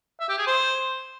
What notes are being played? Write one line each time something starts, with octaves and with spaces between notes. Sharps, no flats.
E5
G4
G#4
C5